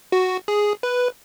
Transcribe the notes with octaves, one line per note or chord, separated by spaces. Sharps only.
F#4
G#4
B4